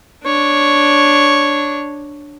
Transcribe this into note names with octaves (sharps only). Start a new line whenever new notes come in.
D4 C#5